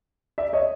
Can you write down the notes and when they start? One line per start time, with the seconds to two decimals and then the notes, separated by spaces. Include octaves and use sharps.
0.38 D5 E5
0.53 C#5 D#5